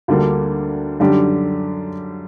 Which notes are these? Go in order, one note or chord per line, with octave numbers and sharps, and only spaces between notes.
D2 D3 G3 A#3 D4
F#2 D3 G3 D4 G4